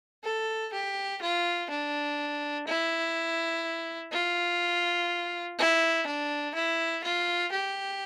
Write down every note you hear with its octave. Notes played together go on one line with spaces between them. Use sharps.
A4
G4
F4
D4
E4
F4
E4
D4
E4
F4
G4